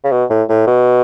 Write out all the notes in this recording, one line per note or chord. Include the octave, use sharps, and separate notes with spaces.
C#3
B2
A2
A2
B2